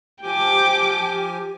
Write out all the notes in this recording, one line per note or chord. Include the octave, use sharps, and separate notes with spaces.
F3 G4 G5 G#5 D6